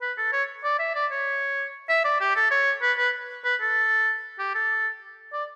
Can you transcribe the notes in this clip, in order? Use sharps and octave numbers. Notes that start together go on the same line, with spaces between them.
B4
A4
C#5
D5
E5
D5
C#5
E5
D5
G4
A4
C#5
B4
B4
B4
A4
G4
A4
D5